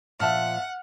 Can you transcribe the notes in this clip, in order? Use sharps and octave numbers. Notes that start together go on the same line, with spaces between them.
A#2 F3 E5 F#5 A5 F6